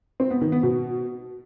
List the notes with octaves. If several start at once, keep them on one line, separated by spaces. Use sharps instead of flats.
C4
B3
D#3
B3
B2